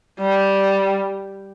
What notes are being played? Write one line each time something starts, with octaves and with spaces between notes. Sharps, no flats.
G3